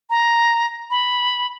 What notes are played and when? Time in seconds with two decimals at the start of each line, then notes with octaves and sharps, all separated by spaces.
0.10 A#5
0.90 B5